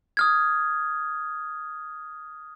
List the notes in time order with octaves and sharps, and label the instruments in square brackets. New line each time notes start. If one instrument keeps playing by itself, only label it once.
[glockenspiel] D#6 F6 G#6